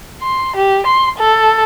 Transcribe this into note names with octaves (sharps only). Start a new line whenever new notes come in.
C6
G4
C6
A4